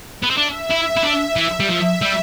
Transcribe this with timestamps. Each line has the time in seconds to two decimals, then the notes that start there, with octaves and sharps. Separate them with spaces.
0.23 B3
0.30 C4
0.37 D4 E5
0.70 E4
0.96 E4
1.03 D4
1.36 E3
1.60 G3
1.69 F3 E5
2.02 G3